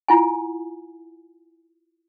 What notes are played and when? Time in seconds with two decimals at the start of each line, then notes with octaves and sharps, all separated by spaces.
0.08 E4 F4 F#5 G#5